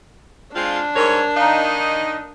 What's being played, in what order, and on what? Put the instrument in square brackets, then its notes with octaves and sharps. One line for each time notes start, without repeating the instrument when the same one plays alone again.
[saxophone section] G#3 C4 F4 [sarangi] D4
[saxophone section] G#2 G3 C#5 [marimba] A#4
[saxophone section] D#3 D#4 D#5 [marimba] F5 A#5